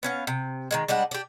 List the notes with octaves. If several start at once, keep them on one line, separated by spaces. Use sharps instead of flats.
B3 C#4 F5
C3
D#3 F3 G#3
G3 G#3 D4 F#5
D4 G4